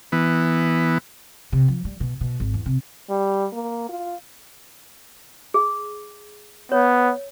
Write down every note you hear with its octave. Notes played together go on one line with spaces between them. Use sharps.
E3 B3
C3
F3
G3
B2
B2
G#1
E2
C3
G3
A#3
F4
G#4
B3 C#5